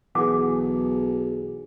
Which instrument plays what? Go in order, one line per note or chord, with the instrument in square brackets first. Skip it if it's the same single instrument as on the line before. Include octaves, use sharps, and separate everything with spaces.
[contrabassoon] B1 [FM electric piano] E3 G#4 [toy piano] F#5 D6